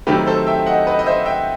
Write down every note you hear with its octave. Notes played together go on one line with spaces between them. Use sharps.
C3 D#3 F#3 A3 G4 B4
A4 C5
E5 G5
D#5 F#5
B4 D#5
D#5
C5 E5
E5 G5